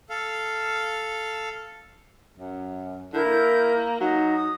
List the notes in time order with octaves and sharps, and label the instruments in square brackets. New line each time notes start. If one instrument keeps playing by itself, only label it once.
[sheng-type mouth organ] A4 F5
[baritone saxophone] F#2
[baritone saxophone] D3 [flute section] E4 A#4 G6
[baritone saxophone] A#3
[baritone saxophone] F#3 [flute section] D#4
[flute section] D#6